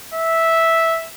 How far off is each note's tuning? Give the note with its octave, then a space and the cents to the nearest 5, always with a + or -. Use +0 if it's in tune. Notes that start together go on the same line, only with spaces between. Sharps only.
E5 -5